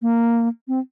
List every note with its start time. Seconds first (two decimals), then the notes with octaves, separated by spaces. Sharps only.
0.02 A#3
0.68 C4